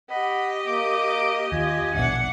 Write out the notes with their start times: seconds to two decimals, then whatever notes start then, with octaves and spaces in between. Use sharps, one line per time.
0.11 G4 D#5 F#5 B5
0.67 A#3 D6
1.52 D#2 F4 G#5
1.94 D#1 A#1 B2 D4 E5 F#5